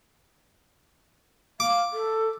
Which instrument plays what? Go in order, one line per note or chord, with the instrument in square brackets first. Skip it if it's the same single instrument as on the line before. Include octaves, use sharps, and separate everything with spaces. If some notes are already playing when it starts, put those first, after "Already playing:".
[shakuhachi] F5 [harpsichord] D6
[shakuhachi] A4